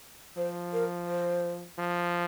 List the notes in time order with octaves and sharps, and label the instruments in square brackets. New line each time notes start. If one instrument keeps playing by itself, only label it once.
[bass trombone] F3 [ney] C5
[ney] A#4
C5
[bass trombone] F3